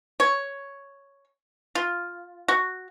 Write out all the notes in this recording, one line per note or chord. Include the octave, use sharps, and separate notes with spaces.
C#5
F4
F#4